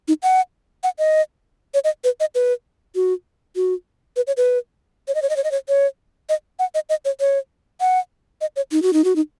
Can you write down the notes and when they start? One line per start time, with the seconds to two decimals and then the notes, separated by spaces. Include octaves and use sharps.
0.08 D#4
0.23 F#5
0.83 F#5
0.99 D#5
1.74 C#5
1.84 D#5
2.04 B4
2.20 D#5
2.35 B4
2.95 F#4
3.56 F#4
4.16 B4
4.27 C#5
4.37 B4
5.08 C#5
5.15 D#5
5.22 C#5
5.30 D#5
5.37 C#5
5.44 D#5
5.51 C#5
5.68 C#5
6.29 D#5
6.59 F#5
6.75 D#5
6.89 D#5
7.05 C#5
7.20 C#5
7.81 F#5
8.41 D#5
8.56 C#5
8.72 D#4
8.82 F#4
8.93 D#4
9.04 F#4
9.16 D#4